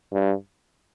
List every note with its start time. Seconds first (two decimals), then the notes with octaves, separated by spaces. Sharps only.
0.13 G2